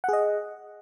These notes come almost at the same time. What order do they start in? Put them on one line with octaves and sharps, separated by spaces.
F#5 G#4 D#5